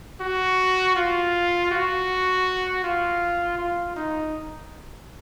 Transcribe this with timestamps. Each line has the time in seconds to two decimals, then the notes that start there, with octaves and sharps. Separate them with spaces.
0.21 F#4
0.96 F4
1.71 F#4
2.84 F4
3.58 F4
3.96 D#4